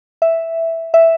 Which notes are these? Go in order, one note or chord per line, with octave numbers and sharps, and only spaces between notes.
E5
E5